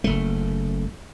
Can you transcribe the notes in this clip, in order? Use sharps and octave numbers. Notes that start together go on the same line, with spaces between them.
F#1 A3